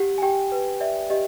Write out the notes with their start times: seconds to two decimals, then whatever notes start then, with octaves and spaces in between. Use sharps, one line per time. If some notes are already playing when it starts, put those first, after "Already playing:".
Already playing: G4 F#5
0.18 G#5
0.22 G4 G5
0.52 B4
0.80 D5 E5
1.10 G4 D#5